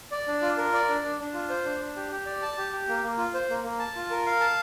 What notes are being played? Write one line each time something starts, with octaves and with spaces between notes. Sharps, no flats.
D5
D4
F4
A#4
D5
D4
D4
D4
F4
C5
D4
D4
G4
G4
D5
A5
G4
G4
A#3
A#3
F4
C5
A#3
A#3
A5
F4
A#4
F5
A5